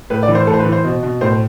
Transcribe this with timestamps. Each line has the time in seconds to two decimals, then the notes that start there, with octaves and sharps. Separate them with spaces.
0.10 A2 B4
0.23 D5
0.28 E3
0.35 C5
0.47 A2 A4
0.53 C5
0.59 B4
0.65 E3
0.72 C5
0.84 B2
1.03 B2
1.21 A2 C5